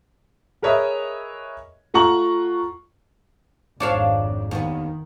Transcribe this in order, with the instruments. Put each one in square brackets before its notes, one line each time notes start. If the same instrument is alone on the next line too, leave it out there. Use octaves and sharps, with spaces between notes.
[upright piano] G#4 A#4 B4 C#5 D#5 E5
A3 F4 F#5 A#5 C#6 F#7
[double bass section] G#1 F2 G#2 [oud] D4 C#5 F5
[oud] D#2 B3 [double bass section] D#3